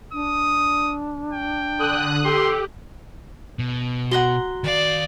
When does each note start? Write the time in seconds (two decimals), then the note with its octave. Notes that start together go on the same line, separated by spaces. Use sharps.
0.13 D4 D#6
1.33 G5
1.79 D3 D#6 F#6
2.24 G4 A4 C6
3.59 B2
4.11 F#4 F#5 A#5 C6 G7
4.64 D#3 D5 F5